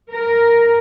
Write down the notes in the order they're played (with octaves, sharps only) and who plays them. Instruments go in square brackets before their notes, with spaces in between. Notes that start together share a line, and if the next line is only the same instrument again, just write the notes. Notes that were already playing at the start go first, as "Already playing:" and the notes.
[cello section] A#4